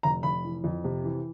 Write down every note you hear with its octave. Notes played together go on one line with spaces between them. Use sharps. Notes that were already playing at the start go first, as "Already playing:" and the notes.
F1 A#5
F1 B5
E3
F2
C3
E3